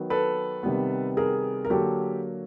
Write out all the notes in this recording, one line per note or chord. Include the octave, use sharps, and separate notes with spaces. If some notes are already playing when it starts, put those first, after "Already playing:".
Already playing: D#3 F#3 B3
A4 B4
C3 D#3 G3 B3
G#4 A#4
A#4
D3 F#3 A#3 G4 A4